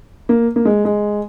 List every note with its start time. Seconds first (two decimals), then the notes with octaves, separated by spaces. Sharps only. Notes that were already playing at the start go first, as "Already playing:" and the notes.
0.29 A#3
0.56 A#3
0.65 G#3
0.85 G#3